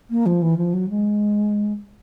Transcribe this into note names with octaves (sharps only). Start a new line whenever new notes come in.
A#3
F3
E3
F3
F#3
G#3